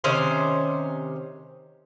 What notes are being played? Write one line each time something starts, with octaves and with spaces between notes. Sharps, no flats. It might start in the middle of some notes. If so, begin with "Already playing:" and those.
C3 D#3 C#4 C5